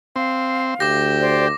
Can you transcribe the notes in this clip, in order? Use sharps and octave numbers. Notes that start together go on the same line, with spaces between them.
C4 F5
D2 G4 D6 A#6
C5 D5